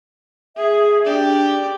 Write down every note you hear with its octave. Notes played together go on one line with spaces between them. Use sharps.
G#4 E5
D4 G4 D5